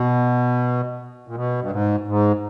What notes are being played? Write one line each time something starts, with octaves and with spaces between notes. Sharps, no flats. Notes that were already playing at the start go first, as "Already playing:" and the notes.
Already playing: B2
A#2
B2
G2
G#2
G#2